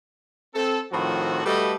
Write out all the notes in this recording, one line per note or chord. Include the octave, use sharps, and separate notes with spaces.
C4 A4
A2 D#3 F3 C4 F#4
G3 A3 F#4 A4 B4 D#5